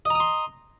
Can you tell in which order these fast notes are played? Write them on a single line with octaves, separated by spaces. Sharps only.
D#5 A#5 D#6 C6